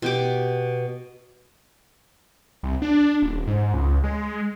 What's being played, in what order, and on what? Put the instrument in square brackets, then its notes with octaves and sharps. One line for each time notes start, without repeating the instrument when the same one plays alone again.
[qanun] B2 G4 D6
[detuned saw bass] C2
D4
D#1
G#2
C#2
G#3